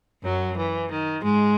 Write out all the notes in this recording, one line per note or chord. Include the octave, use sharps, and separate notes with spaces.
F#2 F#3
E3
D#3
G#2 G#3